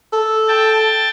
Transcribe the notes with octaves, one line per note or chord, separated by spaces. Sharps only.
A4
G5 A5